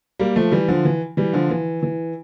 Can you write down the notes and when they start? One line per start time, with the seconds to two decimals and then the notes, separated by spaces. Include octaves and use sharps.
0.19 G3 A#3
0.36 F3 A3
0.51 E3 G3
0.68 D3 F3
0.85 E3
1.17 E3 G3
1.33 D3 F3
1.50 E3
1.83 E3